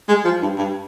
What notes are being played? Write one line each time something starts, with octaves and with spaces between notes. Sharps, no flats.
G#3
F3
G2
G2